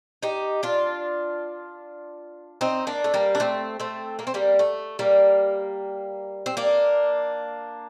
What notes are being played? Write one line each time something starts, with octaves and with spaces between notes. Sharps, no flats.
D#4 G4
D4 F4
C4 D#4
A#3 D4
A3
G3 A#3
D4
A3 C4
A3 C4
A#3
C4
G3 A#3
A3
G3 A#3
C4
A#3 D4